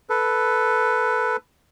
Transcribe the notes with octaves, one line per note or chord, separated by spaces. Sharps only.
A4 B4